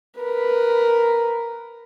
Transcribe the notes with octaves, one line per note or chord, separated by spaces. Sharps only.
A#4 B4